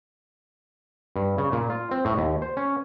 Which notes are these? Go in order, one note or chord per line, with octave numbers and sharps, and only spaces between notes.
G2
C#3
A#2
F4
C4
A2
D#2
C5
C#4